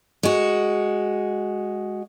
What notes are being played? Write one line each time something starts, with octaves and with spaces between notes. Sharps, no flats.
G#3 F#4